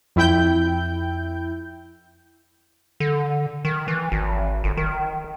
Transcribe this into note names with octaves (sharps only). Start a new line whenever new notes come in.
F2 E4 G5 G6
D3
D#3
E3
G#1
G1
D#3